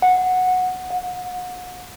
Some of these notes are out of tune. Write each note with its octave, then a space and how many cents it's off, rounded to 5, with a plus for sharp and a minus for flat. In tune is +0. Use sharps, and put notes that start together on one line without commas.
F#5 -10
F#5 -35